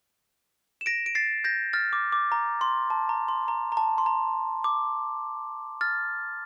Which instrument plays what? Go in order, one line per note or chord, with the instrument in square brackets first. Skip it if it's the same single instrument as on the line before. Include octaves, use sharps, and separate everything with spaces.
[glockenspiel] E7
A#6 D7
D7
A6 C7
G6 A#6
F6 A6
D6
D6
A#5
C6
A5
A#5
C6
A#5
A#5
A5
C6
A#5
D6
F6 A6